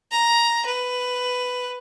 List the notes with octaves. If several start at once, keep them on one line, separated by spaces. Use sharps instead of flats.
A#5
B4